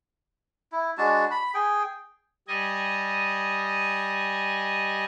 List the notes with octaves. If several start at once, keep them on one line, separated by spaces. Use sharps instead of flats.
E4
G#3 D4 F#4 A5
B5
G#4 G5
G3 D#5 G#5